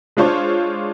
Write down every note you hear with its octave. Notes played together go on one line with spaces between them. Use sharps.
G#3 D4 F4 C5 C#5